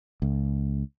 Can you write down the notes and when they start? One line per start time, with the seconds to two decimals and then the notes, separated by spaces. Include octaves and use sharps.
0.22 C#2